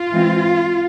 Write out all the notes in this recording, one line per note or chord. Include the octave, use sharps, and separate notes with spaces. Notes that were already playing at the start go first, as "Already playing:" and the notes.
Already playing: F4
E3 G#3 C4